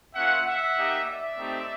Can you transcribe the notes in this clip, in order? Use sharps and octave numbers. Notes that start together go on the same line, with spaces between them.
A#3 C#4 F4 E5 F#5
E5 F#5
A#3 D#4 G4
D5 E5
A3 C4 D#4 G4